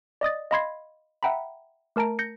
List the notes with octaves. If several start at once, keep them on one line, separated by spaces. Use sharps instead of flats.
D5 D#5 D#6 A6
D#5 F5 B5 C6 G#6 C7
E5 F#5 G5 A#5 B5
A3 A#4 A5 A#5 D7
G6 A#6 C#7